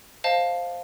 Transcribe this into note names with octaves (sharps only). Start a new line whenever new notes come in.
C5 D#5 F5 A5